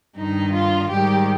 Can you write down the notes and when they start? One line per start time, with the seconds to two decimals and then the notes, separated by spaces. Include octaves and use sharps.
0.16 G2 D#3 D#4
0.53 F4
0.90 G#2 D#3 G3 G4